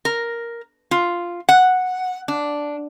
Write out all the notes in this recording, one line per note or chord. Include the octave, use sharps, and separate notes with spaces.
A#4
F4
F#5
D4